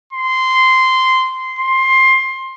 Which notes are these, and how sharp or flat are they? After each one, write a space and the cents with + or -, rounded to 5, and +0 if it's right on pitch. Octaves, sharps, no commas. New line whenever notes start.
C6 -10
C6 +15